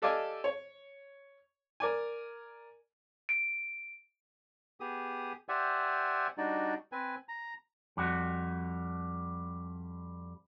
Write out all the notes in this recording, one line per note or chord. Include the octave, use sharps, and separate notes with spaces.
G4 A4 D5 D#5 F5 G#5
C#5
A#4 D5 G#5
D7
B3 G4 G#4 D#6
G4 C5 D5 E5 F#5 G#5
G3 D4 D#4 F#4 D5
C4 B4 G#5
A#5
F2 G3 F#4